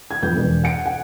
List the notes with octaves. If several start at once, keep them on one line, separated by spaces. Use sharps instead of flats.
G#6
F2 B3 G6
E1
F#5 C#7 D7
F#5